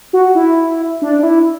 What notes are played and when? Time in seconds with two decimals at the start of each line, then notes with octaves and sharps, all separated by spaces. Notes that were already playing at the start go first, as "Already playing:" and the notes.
0.13 F#4
0.35 E4
1.02 D4
1.19 D4
1.23 E4